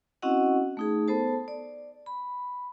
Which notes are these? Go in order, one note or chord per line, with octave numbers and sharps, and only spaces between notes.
C4 C#4 E4 F#4 D#5 F#5
A3 D#4 G#4
B3 A4 C5 A5
D5
B5